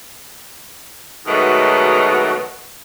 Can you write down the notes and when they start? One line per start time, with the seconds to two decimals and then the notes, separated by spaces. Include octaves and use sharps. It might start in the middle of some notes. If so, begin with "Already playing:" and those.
1.26 G#2 B2 D#3 F#3 A3